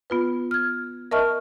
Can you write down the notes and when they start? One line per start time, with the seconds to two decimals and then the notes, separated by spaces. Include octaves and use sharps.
0.10 B3 F4 B4
0.51 F6 G#6
1.11 A#4 D#5 E5 A5 C#6 F6